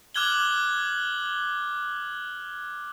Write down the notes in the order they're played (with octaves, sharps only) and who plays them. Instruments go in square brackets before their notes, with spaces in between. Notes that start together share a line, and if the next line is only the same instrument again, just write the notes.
[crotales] D6 F6 F#6 G#6 F#7 G7